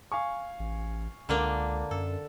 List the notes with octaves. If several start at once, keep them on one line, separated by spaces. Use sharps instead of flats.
F5 G#5 C#6
A1
C#2 D3 A#3 D4
F#2 A4